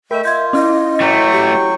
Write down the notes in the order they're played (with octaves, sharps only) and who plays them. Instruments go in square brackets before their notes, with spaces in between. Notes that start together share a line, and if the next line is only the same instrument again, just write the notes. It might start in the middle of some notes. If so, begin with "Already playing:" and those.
[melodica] A3 E5 G5 [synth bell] A#4 D#5
[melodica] F4 [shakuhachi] E5 [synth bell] G6 G#6
[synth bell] C#4 E4 [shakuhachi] D#5
[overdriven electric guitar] E3 A3 [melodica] F#3 G5 C#6
[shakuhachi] G4